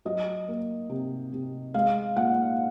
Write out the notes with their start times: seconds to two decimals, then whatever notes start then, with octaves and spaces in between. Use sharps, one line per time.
0.05 F#3 D#5
0.48 A#3
0.90 C3
1.33 C3
1.74 G#3 F5
2.16 A#2 F#5